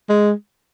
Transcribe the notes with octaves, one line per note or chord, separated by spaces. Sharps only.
G#3